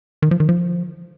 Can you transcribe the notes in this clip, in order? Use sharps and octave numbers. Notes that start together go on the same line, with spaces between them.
D#3
F3
D#3
F3